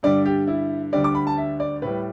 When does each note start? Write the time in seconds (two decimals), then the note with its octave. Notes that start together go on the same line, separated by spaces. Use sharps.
0.03 G2 D3 G3 D5
0.25 G4
0.47 E4
0.93 D2 D3 G3 D5
1.04 D6
1.15 B5
1.27 A5
1.37 E5
1.60 D5
1.82 A2 G3 B4